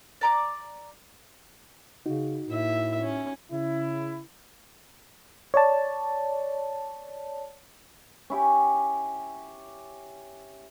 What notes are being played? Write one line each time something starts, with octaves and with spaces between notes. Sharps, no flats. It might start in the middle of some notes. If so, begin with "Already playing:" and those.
D5 A#5 D6
C#3 D#4 F#4
A2 A#3 E5
C#4
C#3 E4
C#5 D5 A5
C#4 E4 G4